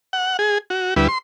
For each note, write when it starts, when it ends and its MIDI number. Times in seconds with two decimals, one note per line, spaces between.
0.13 0.37 78
0.39 0.58 68
0.70 0.94 66
0.96 1.08 38
0.96 1.08 55
0.96 1.08 64
0.96 1.08 71
1.08 1.18 84